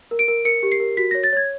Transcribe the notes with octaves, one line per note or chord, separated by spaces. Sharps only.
A#4
D7
A#4
A#4 C#7
G4
C7
A#4
F#4 B6
C#5 A#6
A6
C#5 G#6